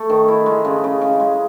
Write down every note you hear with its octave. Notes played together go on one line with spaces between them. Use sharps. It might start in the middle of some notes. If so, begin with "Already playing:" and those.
Already playing: A3
D#3
E4
G#3
C#3
C#3
C#3
G#3